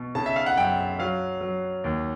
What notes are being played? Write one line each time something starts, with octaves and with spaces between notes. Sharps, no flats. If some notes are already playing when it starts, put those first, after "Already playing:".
Already playing: B2
C#3 A5
E5
F5
F#5
F#2 G5
F#3 F5
F#3
D#2